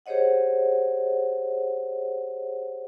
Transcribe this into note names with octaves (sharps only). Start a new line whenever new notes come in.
G4 G#4 C5 C#5 D#5 F#5